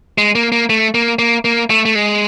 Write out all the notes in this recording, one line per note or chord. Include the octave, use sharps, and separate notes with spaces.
G#3
A#3
A#3
A3
A#3
A#3
A#3
A3
A3
G#3